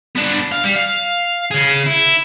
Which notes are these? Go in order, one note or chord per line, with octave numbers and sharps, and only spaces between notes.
B3 D4
F5
G3
F5
C#3 G#4
E4